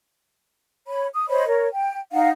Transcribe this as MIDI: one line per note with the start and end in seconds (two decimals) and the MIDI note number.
0.87 1.06 73
0.87 1.06 83
1.13 1.25 87
1.29 1.45 72
1.29 1.45 73
1.29 1.45 75
1.29 1.45 83
1.47 1.67 70
1.47 1.67 73
1.72 1.99 79
2.13 2.29 63
2.13 2.29 77
2.13 2.29 78